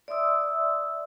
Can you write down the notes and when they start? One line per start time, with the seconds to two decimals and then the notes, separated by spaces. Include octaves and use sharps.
0.08 D5 E5 C6 D#6 E6